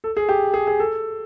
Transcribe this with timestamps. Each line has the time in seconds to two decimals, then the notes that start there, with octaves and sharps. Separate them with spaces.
0.04 A4
0.17 G#4
0.29 G4
0.54 G#4
0.67 G#4
0.80 A4